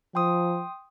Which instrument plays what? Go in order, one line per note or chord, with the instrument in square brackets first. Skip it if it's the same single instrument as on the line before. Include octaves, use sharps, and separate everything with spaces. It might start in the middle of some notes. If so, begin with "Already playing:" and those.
[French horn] F3 [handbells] G5 C6 D#6